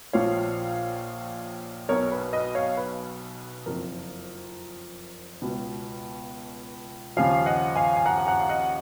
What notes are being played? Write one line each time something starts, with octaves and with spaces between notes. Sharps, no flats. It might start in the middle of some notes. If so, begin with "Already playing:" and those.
A#1 A#2 F3 C#5 F5
B1 B2 A#4 C#5
B4
B4 D#5
C#5 F5
B4
F#1 F2 F3 A#4
C#2 B2
D#2 C#3 F3 F5 G#5
D#5 F#5
F5 G#5
G#5
F#5 A#5
G#5
F#5 A#5
F5
D#5 F#5